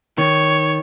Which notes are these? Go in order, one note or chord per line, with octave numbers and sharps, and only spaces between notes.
D#3 C#5